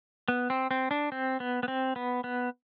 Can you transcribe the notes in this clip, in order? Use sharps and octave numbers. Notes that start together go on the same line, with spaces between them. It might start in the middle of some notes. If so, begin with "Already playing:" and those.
B3
C4
C4
D4
C4
B3
B3
C4
B3
B3